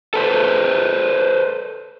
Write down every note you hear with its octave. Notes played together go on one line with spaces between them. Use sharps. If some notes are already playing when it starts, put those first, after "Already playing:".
A4 B4 C5